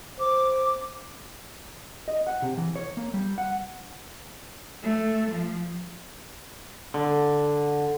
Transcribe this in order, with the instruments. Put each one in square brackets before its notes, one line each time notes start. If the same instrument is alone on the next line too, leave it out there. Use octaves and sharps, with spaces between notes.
[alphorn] C5 [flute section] D6
[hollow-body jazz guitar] D#5
F#5
C3
E3
C#5
A#3
G3
F#5
[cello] A3
F3
[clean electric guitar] D3